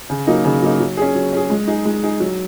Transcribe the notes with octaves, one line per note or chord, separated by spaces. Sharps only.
C#3
F#3 A#3 D#4
C#3
F#3 A#3 D#4
F#3
C#4 G#4
F#3
C#4 G#4
G#3
D#4 G#4
G#3
D#4 G#4
F#3